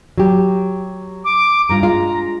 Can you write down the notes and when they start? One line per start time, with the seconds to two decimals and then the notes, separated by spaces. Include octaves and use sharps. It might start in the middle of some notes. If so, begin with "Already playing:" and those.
0.18 F#3 G4
1.25 D6
1.69 G2 F4 A#5
1.83 G#3 F4